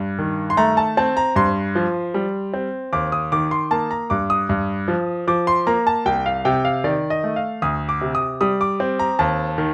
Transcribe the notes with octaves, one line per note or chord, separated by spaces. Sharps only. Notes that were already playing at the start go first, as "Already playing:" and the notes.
Already playing: G2
D#3
C6
A3 A#5
A5
C4 A5
A#5
G2 C6
F3
G3
C4
D#2 D6
D#6
D#3 D6
C6
A#3 A5
A#5
G2 D6
D#6
G2
F3
F3 D6
C6
A#3 A#5
A5
C2 G5
F5
C3 G5
F5
D#3 D5
D#5
A3
F5
D2 D#6
D6
C3
D#6
G3 D#6
D6
C4
A#5
D#2 A5
D#3